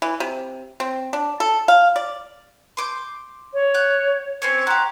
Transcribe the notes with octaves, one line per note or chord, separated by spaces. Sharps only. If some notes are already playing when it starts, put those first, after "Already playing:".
E3
C3
C4
D4
A4
F5
D5
C6 D6 G6
C#5
F#5 F#6 G6
C4 C#4 C#5
F#4 G4 A#5 C6 F#6